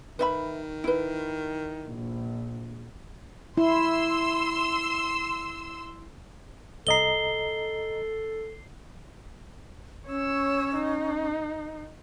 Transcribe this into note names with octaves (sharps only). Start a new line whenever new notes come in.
D#3 B4 E5 B5
E4 B4
A#1
E4 C6 E6
C2 A4 D#5 A#5 C7 G7
C#4 C#5 E6
D#4